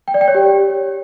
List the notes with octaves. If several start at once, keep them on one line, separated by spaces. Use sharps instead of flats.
G5
D5
G5
C#5
G4